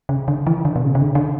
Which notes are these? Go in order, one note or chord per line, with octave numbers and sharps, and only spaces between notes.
C#3
D3
E3
D3
B2
C#3
C#3
D3
D3